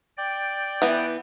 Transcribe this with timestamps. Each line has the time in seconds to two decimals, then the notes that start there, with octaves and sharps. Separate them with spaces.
0.17 D5 G5
0.82 E3 B3